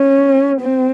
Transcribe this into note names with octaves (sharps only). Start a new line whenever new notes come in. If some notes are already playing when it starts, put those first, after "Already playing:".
Already playing: C#4
C4